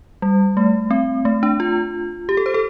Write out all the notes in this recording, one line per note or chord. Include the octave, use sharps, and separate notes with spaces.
G3
A3
C4
A3
D4
F4
G4
A4
C5
A4